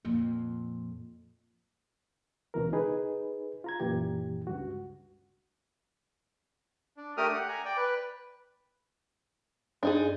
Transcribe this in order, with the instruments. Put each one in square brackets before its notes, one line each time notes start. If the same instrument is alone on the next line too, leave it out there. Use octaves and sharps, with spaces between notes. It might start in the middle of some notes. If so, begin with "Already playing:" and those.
[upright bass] F2 A#2
[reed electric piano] C#2 B2 E3 A#4
D#4 G#4 B4
F4 A#5 G#6
F#2 A#2 E3 G4
C#2 G2 F#4
[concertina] D4
A3 D4 G4 A#4 D#6 F6
G4 F#5
G#5 A#5
D5 G5
B4
[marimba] G2 [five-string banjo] D4 D#4 G#4